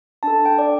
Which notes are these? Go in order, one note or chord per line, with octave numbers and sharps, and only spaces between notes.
D4 A4 A5
G5
D5